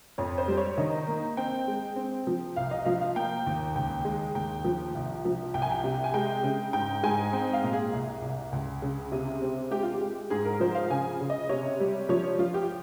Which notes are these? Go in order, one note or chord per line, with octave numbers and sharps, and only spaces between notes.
F2 C#5
C5
G3
C#5
D#3 D#5
A#3
C4 G5
G#3
C4
F3
C2 F5
D#5
F3 F5
F5
A#3 G5
D#2
C#2 G5
G#3
D#2 G5
F3
C2
F3
C2 G5
G#5
G5
C3
G#5
G#3 G5
C#3
G#2 G5
G#2 G#5
C4 G5
F5
A#2
G#4
C2
C2
C#2
C#3
C3
C4
G#3 G4
F4
G4
G#3
G#2 G#4
A#4
F3 C5
F5
C#3 G#5
C#3
D#5
C3 C#5
G3
F3 C#5
F3 F4
G4